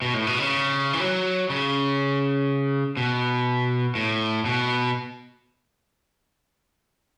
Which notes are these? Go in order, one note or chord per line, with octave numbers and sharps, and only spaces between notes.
B2
A2
B2
C#3
E3
F#3
C#3
B2
A2
B2